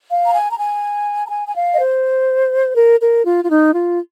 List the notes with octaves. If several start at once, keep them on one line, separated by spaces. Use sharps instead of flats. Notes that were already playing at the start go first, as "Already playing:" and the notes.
F5
A#5
G#5
A#5
G#5
A#5
G#5
G#5
F5
D#5
C5
A#4
A#4
F4
F4
D#4
F4